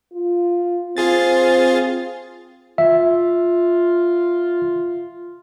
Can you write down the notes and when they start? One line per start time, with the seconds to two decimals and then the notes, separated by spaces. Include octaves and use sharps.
0.13 F4
0.97 C4 F4 G#4 A6
2.78 F4 E5